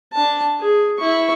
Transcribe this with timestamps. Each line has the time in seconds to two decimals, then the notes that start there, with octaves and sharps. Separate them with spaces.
0.13 D4 A5
0.60 G#4
0.98 E4 C#6